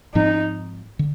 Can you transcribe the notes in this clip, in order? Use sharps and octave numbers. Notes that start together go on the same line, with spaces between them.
G#2 F3 C4 D#4
D3